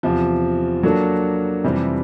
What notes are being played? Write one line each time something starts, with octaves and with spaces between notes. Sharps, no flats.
E2 C3 F3
F#3 A#3 D4 F#4 A4
F2 C3 E3 G3 C4